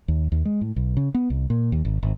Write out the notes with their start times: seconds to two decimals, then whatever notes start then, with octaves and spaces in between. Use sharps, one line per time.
0.08 D#2
0.32 D#2
0.45 G#3
0.61 A2
0.76 B1
0.97 C#3
1.14 B3
1.30 C2
1.50 A#2
1.72 D#2
1.85 G#1
2.03 G#1